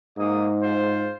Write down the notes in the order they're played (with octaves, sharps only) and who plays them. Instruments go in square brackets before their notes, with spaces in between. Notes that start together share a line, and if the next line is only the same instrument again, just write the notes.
[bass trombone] G#2 [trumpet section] A#3 D#5 D#6
[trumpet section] F4 C5